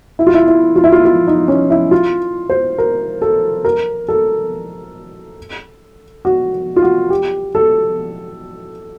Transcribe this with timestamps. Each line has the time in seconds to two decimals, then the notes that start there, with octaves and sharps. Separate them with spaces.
0.19 E4
0.27 F4
0.34 E4
0.47 E4
0.76 F4
0.84 E4
0.92 F4
1.05 F4
1.27 D#4
1.48 C#4
1.70 E4
1.91 F4
2.50 C5
2.78 A#4
3.22 A4
3.65 A#4
4.08 A4
6.25 F#4
6.76 F4
6.82 F#4
7.10 G4
7.55 A4